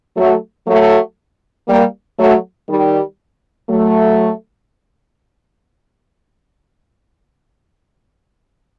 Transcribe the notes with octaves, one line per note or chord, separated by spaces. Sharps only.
F#3 A3
F#3 A3
G3 A#3
F#3 A3
D#3 G3
F#3 A3